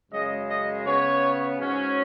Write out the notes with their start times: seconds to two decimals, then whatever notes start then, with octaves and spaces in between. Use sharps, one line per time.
0.11 F#2 C#3 G#3 D#5
0.48 D#5
0.85 C#3 B3 C#5
1.59 G#2 F#3 C#4